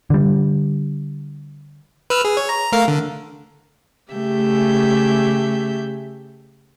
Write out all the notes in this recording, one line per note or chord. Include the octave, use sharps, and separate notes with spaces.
D3 G3
B4 E6 F6
G#4
C#5
A#5
A3 A#4 F5
D3
C#3 A3 G4 E5 G6